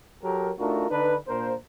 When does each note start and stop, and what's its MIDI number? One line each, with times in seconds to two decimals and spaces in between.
0.23 0.50 54
0.23 0.50 67
0.23 0.50 69
0.23 0.50 70
0.59 0.89 57
0.59 0.89 62
0.59 0.89 63
0.59 0.89 65
0.59 0.89 66
0.59 0.89 70
0.89 1.15 50
0.89 1.15 62
0.89 1.15 63
0.89 1.15 71
1.28 1.54 46
1.28 1.54 58
1.28 1.54 62
1.28 1.54 70
1.28 1.54 72